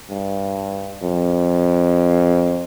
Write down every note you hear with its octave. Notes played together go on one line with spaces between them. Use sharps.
G2
F2